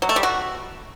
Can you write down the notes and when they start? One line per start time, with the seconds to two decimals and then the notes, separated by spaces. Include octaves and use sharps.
0.02 F#3
0.09 A3
0.16 G3
0.23 F#4